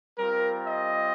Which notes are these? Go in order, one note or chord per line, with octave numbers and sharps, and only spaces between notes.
G3 C4 F4 A#4
D#5